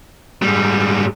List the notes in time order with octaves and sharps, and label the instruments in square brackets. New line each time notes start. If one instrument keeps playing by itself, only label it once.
[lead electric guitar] G#2 G3